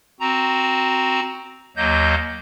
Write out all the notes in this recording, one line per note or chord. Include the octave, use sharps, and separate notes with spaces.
C4 F#4 A#5
D#2 F#3 A#3 D#5 G6